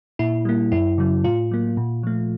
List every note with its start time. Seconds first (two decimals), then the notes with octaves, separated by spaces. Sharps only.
0.19 A#2 E4
0.45 G3 A#3
0.72 F#2 E4
0.98 C#3 F#3
1.24 A2 F4
1.51 F#3 A#3
1.77 A#2
2.03 F3 A3